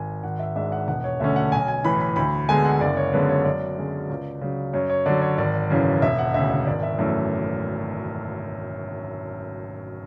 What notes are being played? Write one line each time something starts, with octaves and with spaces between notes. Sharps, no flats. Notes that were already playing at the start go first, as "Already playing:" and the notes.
Already playing: G#1 G#5
G#1 F#5
E5
G#2 G#3 D4 E5
F#5
E1 F#5
C#5
D2 D3 A3 C#4 E5
F#5
B1 G#5
G#5
A2 E3 B5
B5
D2 B5
D3 G#3 B3 G#5
F#5
F#1 D5
C#5
F#2 D3 G#3 B3 B4
C#5
F#2 D5
D3 G#3 C#4
C#2
C#3 F#3
F#2 C#5
C#5
D3 F#3 D5
C#5
G#1 D5
F#2 C#3 E3
E1 E5
F#5
D2 C#3 E5
E5
G#1 D5
E5
F#2 E3 A3 E5